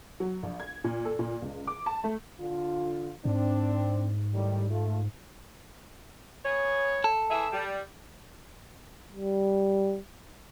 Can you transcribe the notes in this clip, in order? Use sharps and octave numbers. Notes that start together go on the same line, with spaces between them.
F#3
A#1
G#6
A#2
A4
A#2
C#2
D6
A5
A3
D3 F4
G#2 C4 D4
A2 D#3 G3
A3 F4
B3 G#4 C#5
A4
E3 G#4 E5
G3
G3